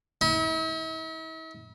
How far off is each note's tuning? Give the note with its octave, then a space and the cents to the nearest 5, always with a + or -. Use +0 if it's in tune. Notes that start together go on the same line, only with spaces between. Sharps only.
E4 -45